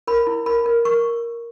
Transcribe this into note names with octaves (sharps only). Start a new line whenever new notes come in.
A#4 B5
E4
A#4 B5
A#4
A#4 C#6